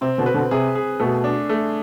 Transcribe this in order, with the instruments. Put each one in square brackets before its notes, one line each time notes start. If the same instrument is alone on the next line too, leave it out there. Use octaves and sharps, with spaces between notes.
[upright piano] C3 [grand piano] C4
[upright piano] B2 D3
[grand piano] B4
[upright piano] B2 D3
[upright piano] C3 [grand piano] G#4
[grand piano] G#4
[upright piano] B2 [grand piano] A3
[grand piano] D4
A3